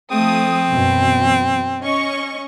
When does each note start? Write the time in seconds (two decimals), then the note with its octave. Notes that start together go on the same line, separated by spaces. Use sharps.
0.11 F3 A3 C4 D#6
0.71 F#2 B2 E3
1.82 C#4 D#5 C#6